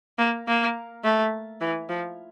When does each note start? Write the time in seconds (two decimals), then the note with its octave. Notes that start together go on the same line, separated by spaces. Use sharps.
0.18 A#3
0.48 A#3
1.04 A3
1.61 E3
1.90 F3